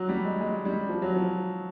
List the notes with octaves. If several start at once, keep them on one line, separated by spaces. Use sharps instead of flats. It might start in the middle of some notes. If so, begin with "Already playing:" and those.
Already playing: F#3
G3
G#3
G#3
G3
F3
F#3
F3